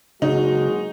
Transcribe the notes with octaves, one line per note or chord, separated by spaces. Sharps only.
F#1 C#3 G#3 D#4 F#4